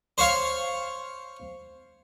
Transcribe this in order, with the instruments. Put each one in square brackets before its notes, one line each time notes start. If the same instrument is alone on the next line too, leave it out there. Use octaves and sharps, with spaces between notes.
[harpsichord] C5 C#5 F5 C#6